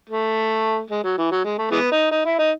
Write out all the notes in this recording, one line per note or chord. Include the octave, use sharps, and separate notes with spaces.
A3
G#3
F#3
E3
F#3
G#3
A3
E3 G#3 B3
D#4
D#4
E4
D#4